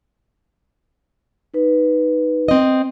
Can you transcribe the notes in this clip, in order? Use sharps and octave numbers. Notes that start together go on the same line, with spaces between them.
D#4 B4
C4 D#5